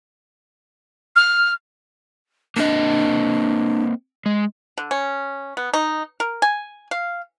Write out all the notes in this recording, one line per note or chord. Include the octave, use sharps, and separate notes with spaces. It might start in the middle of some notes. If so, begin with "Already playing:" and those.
F6
A#3 C4 D4 D#5
G#3
D3
C#4
B3
D#4
A#4
G#5
F5